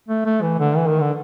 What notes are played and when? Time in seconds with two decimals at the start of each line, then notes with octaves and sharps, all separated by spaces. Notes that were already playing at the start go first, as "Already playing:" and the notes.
0.08 A3
0.25 A3
0.42 E3
0.59 D3
0.77 E3
0.88 D#3
1.00 D3